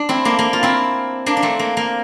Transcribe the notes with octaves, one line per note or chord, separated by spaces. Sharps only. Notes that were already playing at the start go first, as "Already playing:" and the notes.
Already playing: D4
C4 E4
A#3 D4
A#3
F4
C4 E4
A#3 D4
D4
A3 C4
A#3
A#3